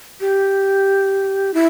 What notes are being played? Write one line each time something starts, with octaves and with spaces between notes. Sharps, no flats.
G4
E4